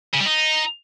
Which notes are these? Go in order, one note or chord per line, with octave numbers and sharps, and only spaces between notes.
C#3
G3
D#4